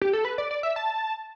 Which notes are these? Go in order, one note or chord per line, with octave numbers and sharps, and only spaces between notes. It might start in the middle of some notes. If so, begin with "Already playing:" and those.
G4
A4
B4
D5
D5
E5
A5